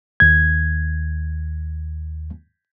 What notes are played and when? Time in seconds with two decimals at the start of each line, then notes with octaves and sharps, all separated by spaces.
0.20 D#2 G#6